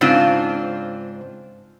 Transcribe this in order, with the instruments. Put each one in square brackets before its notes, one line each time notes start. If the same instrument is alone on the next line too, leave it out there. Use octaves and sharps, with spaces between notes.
[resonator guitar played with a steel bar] G#2 C#3 C4 D4 F4